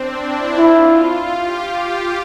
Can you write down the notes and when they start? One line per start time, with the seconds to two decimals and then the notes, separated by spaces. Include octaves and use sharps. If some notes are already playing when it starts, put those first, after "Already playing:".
Already playing: C4 D4
0.22 E4
0.58 E4 F4
0.95 F4
1.30 G4
1.66 F4